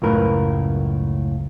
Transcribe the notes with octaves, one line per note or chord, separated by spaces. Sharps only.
C#2 F#2 A2 A#4 B4